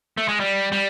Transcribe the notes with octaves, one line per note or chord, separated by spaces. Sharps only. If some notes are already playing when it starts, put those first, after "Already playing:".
A3
G#3
G3
G3